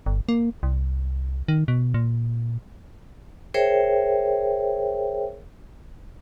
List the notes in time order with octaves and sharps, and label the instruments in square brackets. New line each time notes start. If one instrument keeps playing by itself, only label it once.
[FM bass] G1
A#3
C2
D#3
B2
A#2
[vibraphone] G#4 A#4 C5 C#5 E5 G5